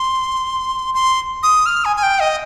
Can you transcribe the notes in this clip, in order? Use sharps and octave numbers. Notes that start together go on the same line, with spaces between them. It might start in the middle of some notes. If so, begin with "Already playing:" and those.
Already playing: C6
C6
D#6
F6
G#5
G#5
G5
D#5